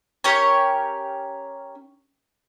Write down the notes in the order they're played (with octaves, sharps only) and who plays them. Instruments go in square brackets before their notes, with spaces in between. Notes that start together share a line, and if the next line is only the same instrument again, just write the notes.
[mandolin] C#4 G4 A#4 C#5